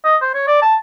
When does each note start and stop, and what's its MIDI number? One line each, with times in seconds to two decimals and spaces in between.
0.05 0.16 75
0.21 0.30 72
0.34 0.44 73
0.48 0.59 74
0.62 0.75 81